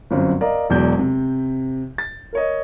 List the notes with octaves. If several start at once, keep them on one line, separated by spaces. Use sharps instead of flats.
G1 F#2 C4
A#4 D5 D#5 F5 A#5
E1 E2 F#3 D5 G6
C3
A6
A#4 C#5 D#5